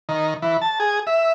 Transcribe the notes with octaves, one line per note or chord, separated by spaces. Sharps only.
D#3
E3
A5
G#4
E5